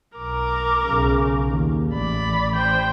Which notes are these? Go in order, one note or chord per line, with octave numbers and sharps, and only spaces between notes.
B1 A#4 D6
B1 C#3
D#2
A1 D5 B5
C5 G5